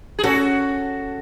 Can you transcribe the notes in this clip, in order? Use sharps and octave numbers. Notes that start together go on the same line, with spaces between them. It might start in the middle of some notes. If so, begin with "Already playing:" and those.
G#4
C#4 F#4 A4